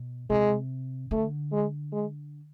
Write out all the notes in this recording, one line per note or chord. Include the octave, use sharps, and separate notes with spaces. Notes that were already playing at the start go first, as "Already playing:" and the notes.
Already playing: B2
C3 G#3
D3 A3
G#3
G#3